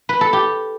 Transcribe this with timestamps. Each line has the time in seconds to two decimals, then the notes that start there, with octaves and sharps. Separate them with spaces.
0.09 B4
0.21 A4
0.33 G4